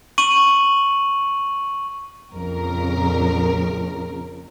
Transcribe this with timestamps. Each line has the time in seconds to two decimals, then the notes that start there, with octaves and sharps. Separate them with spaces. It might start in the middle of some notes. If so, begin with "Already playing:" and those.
0.18 C#6 D#7 F#7
2.32 A#1 F2 C#3 A#4